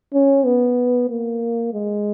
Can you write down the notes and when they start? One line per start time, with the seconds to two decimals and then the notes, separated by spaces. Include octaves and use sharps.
0.14 C#4
0.46 B3
1.10 A#3
1.74 G#3